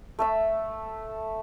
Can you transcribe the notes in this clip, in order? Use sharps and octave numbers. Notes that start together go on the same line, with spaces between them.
A3 A4 E5